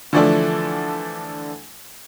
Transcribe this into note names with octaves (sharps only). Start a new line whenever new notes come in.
D3 E3 F3 A3 D4 A4